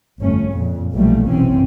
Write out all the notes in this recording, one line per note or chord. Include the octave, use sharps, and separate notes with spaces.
G1 F2 A3 C#4
F2 A#2 C#3
B1 E3 F3 G3 A3 A#3
F#1 B1 C3 E3 C4 C#4